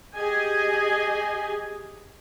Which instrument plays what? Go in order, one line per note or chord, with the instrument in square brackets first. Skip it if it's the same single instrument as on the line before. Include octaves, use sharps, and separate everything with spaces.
[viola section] G4 G#4 D#5 G#5